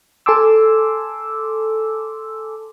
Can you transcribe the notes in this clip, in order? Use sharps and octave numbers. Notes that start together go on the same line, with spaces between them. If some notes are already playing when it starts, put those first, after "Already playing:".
A4 G#5 A5 C6 D6 E6